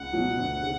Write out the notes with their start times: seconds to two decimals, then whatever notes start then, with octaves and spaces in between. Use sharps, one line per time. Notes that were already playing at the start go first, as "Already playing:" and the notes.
Already playing: C#2 F#5
0.13 B2 F#3
0.38 D2
0.62 C#3